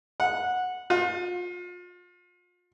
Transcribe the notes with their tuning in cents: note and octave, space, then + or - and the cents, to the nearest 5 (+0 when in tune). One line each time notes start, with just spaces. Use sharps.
F#5 -15
F4 +35